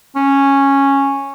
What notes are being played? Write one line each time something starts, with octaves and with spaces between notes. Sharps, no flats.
C#4